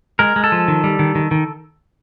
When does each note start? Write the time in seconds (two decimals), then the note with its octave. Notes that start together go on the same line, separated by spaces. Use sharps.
0.19 G#3 A#4
0.36 G#3
0.44 A4
0.52 F3
0.68 D#3
0.84 G3
0.99 D#3
1.15 D#3
1.31 D#3